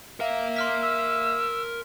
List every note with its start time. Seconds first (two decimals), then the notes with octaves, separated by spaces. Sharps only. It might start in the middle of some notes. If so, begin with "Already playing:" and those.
0.20 A#4 E5 F5
0.56 C6 F6 B6
0.82 E6